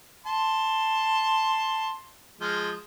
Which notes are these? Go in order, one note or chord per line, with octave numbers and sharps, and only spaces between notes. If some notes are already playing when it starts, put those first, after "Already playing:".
A5 C6
F3 G#3